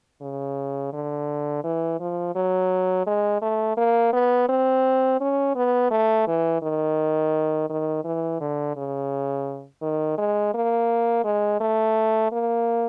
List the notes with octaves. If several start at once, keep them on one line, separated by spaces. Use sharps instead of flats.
C#3
D3
E3
F3
F#3
G#3
A3
A#3
B3
C4
C#4
B3
A3
E3
D#3
D#3
E3
D3
C#3
D#3
G#3
A#3
G#3
A3
A#3